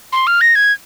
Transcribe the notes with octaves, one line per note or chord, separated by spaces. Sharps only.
C6
F6
A#6
G#6